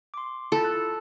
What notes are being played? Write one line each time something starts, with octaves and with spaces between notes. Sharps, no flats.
C6 D6
E4 F4 A4
F#6